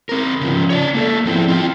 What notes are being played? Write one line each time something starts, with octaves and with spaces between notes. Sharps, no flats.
C4 A#4
C#3 F3
C#5 D5 A5
A#3 A4
F3 C4 E4
C4 F4 G5